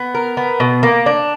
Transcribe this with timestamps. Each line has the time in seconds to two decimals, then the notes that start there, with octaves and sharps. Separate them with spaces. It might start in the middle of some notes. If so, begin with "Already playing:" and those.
Already playing: B3
0.15 A#4
0.37 B3
0.60 B2
0.83 A#3
1.06 D4